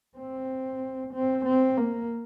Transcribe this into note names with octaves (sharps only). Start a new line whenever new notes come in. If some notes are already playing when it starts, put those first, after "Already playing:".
C4
C4
C4
A#3